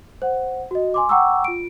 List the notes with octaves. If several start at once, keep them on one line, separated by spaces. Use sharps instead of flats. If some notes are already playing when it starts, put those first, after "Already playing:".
C5 F#5
F#4 D#5
G#5 C6 D6
F#5 G5 A#5 C#6 D6 E6
F4 D7